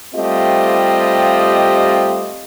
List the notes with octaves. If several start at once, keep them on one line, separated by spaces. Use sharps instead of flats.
G3 A3 C4 F4 G4 D#5